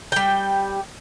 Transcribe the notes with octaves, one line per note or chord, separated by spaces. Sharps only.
G3 G5